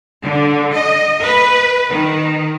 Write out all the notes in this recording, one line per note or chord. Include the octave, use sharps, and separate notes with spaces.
D3
D#5
B4
D#3